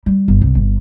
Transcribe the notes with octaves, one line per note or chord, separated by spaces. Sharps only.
G3
G1
C2
G1